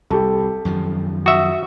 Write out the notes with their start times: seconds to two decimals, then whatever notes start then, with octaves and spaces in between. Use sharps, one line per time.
0.10 C2 G4 A4
0.65 F#2 D#3 F3
1.26 F#4 E5 D#6 E6